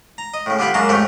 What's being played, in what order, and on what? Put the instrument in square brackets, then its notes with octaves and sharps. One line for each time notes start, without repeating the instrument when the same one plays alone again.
[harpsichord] A#5
D#5
A2 C#3
D3 G3 B3 F4 B4
F#2 F#3 G#3 A#3 A5
F2 G#2 A3 G4 C#5